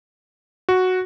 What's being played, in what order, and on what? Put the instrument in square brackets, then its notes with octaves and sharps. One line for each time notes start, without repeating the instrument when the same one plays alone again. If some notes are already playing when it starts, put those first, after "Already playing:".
[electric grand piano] F#4